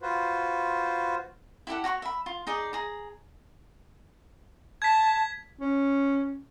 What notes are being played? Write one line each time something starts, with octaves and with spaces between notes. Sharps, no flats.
F4 F#4 B4 C5
E4 G4 A4 F#5
F#4 C#5 A#5 C#6
E5 B5
F4
D#4 G#4 D5
G#4 A#5
A5 G#6 B6
C#4